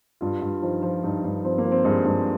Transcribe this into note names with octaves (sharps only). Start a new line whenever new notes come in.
G2 F4
G2
F3 D#4
F3
G2 D#4
G2
F3 C4
A#3
F3
C4
G2 G#3
G2